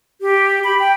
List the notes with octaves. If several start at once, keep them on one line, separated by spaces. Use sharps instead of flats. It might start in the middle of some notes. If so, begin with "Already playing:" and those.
G4
B5
G5